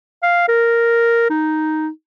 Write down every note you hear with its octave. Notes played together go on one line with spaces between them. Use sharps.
F5
A#4
D#4